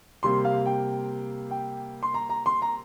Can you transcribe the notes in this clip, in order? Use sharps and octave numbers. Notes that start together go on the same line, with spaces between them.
C3 G3 A#3 C6
F5
G5
G5
C6
A#5
A#5
C6
A#5